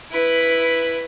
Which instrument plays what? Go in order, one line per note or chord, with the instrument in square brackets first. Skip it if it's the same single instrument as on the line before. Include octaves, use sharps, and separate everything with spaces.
[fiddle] E4 B4